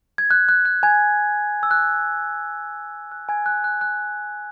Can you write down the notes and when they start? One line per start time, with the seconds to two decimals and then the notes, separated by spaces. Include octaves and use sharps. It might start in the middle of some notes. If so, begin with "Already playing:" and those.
0.18 G#6
0.31 F#6
0.49 F#6
0.65 F#6
0.83 G#5 G#6
1.63 E6
1.71 F#6
3.12 F#6
3.29 G#5 G#6
3.46 F#6
3.64 F#6
3.81 F#6